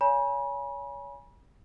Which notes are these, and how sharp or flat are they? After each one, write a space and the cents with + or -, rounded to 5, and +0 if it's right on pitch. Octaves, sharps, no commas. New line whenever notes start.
C#5 +30 G#5 +0 B5 -40